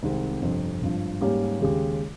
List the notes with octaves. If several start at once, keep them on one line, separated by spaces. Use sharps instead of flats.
C2 C3 D#3 G#3 C4
G1 F2 C3
G#1 G2 F3
G#2 G3 A#3 C#4 G4
D#2 C#3 G#3 C#4 G4